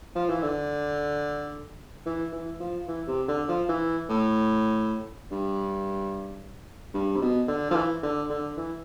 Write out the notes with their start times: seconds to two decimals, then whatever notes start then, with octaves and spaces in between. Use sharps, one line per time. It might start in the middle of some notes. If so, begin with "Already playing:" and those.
0.15 F3
0.29 E3
0.43 D3
2.06 E3
2.32 E3
2.60 F3
2.87 E3
3.07 C3
3.28 D3
3.48 F3
3.69 E3
4.09 A2
5.31 G2
6.94 G2
7.16 C3
7.21 B2
7.48 D3
7.70 F3
7.75 E3
8.03 D3
8.30 D3
8.57 E3